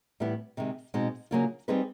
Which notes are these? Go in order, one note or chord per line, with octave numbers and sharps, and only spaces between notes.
A2 E3 G3 B3 E4
C3 D#3 G#3
B2 G#3 C4 D#4
C#3 F#3 A#3 D4 F4
G3 C4 D#4 G#4 B4